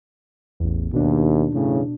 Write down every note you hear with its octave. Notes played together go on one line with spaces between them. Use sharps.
A1 E2
D#2 B2 D4
E2 A2 C#3